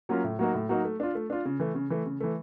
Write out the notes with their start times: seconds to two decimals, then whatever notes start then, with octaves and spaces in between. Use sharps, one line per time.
0.09 F#3 A#3 C#4 F4
0.24 A2
0.39 F#3 A#3 D#4 F#4
0.54 A2
0.69 F#3 A#3 D#4 F#4
0.85 A3
1.00 D4 F4
1.15 A3
1.30 D4 F4
1.45 C#3
1.59 E3 A3
1.75 C#3
1.90 E3 A3
2.06 C#3
2.20 E3 A3